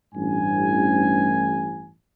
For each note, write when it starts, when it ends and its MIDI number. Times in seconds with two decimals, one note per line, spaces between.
0.15 1.91 33
0.15 1.91 43
0.15 1.91 80